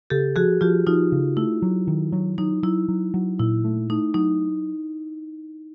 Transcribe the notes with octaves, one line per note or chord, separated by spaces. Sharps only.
C#3 G4 A4
F3 F#4 G#4
F3 F4 G4
F3 D#4 F4
C#3
A3 E4
F#3
D#3
F#3
F#3 D#4
F#3 E4
F#3
F#3
A#2 E4
A3
A3 D#4
F#3 D#4